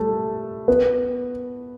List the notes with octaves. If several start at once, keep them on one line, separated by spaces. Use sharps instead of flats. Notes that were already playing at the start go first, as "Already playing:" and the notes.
Already playing: G3 A3 A4
B3 B4